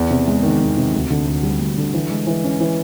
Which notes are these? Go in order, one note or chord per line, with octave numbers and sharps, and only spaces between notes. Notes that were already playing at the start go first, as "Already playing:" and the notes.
Already playing: E2
C3
G#3
D#3
E2
C3
D2
D3
D2
G3
D2
D3
E3
G#3
E3
C#4
E3